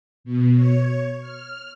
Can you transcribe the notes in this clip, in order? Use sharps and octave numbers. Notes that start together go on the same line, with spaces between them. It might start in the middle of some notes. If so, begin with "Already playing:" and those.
B2
C#5
F6